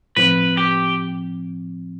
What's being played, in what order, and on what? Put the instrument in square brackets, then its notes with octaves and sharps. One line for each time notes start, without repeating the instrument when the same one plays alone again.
[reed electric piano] A2 F3 C4 [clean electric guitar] B4
[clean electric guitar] G4